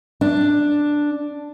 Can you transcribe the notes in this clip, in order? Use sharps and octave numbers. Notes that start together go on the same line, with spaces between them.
D4